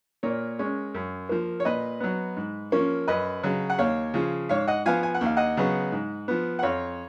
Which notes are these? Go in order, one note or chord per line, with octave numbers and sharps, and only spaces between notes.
A#2 A#4 C#5
G#3 C#4
F#2
F3 A#3
C#5
A#2 B4 D#5
F#3 B3
G#2
F3 A#3 C#4
F#2 B4 D#5
C#3 F#3
F#5
D#2 C#5 F5
C#3 F3
G#2 C#5 F5
D#5 F#5
F3 B3 F5 G#5
G#5
F#5
D#2 F5
D#5 F#5
C#3 F#3 B3
G#2
F3 B3
F#5
F2 C#5 F5